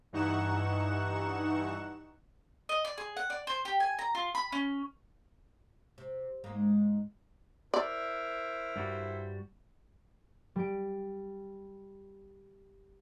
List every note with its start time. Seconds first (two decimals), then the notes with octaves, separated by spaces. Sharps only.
0.13 G2 E3 D#4 F#5 C#6 E7
2.69 D#5
2.85 D5
2.98 G#4
3.17 F#5
3.30 D5
3.47 C5
3.65 G4
3.80 G#5
3.99 A#5
4.15 F4
4.35 B5
4.52 C#4
5.98 C3
6.44 G#2 G#3 A#3
7.74 E4 A#4 C5 D5
8.76 G2 G3 F#4
10.56 G3 D7